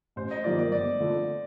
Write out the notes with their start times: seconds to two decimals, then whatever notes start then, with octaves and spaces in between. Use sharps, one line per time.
0.16 A1 C5
0.31 D#5
0.44 G2 D#3 A#3 F4 D5
0.59 D5
0.72 G1 D5
1.00 F2 D3 A3